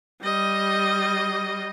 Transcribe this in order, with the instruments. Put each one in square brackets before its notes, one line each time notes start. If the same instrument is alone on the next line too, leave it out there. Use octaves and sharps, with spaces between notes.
[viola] G3 D#5